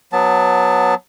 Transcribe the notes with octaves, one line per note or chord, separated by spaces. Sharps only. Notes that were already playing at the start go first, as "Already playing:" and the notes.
F#3 B3 A5